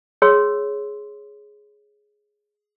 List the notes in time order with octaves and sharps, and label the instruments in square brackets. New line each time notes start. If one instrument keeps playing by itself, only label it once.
[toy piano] G#4 C#5 C6 E6